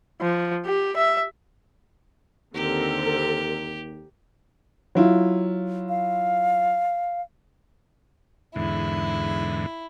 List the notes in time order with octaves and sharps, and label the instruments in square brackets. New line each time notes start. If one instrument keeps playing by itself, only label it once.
[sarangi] F3
G4
E5
[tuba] D#2 [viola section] D3 C4 A#4 [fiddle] G4
[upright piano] F#3 E4 F4
[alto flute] F5
[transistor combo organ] E2 G#2 D3 [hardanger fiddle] E4